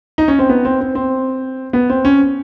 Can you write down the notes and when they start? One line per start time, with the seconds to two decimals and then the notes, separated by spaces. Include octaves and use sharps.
0.18 D#4
0.28 C#4
0.39 C4
0.49 B3
0.65 C4
0.81 C4
0.95 C4
1.73 B3
1.90 C4
2.05 C#4